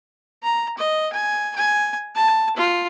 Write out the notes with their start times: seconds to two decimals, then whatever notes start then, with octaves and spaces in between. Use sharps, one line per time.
0.43 A#5
0.77 D#5
1.13 G#5
1.56 G#5
2.15 A5
2.57 F4